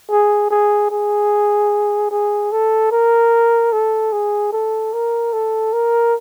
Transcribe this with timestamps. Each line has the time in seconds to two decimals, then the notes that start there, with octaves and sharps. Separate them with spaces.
0.10 G#4
0.50 G#4
0.91 G#4
2.11 G#4
2.52 A4
2.91 A#4
3.72 A4
4.12 G#4
4.52 A4
4.93 A#4
5.33 A4
5.73 A#4